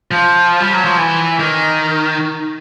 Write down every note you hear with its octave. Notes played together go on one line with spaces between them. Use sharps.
F3
G3
F#3
F3
E3
D#3